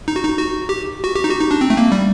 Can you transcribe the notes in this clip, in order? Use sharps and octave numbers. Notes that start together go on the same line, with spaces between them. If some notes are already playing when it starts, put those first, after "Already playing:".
D#4
F#4
D#4
F#4
G4
F#4
G4
D#4
F#4
D#4
D4
C4
A3
A#3
G3